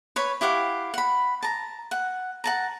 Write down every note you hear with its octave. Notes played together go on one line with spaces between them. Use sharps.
B4 C#5 B5
E4 G4 F5 F#5
F#5 B5
A5 A#5
F#5
F#5 A5 A#5